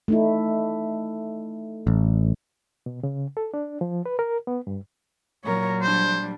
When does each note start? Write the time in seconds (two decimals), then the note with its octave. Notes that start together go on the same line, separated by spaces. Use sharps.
0.08 A3 D#4 E4
1.87 A1
2.86 B2
3.03 C#3
3.37 A4
3.54 D4
3.81 F3
4.06 B4
4.19 A#4
4.47 B3
4.67 G2
5.45 A#2 F#3 A#4 C#5
5.82 G3 D4 C5